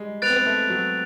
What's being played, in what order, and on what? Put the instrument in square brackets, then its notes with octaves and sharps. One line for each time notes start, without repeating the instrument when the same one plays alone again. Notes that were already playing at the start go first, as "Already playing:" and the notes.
Already playing: [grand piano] G3 G#3
[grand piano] B3 [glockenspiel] F#6 A6 D7 F7
[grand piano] C4
B3
A3
F#3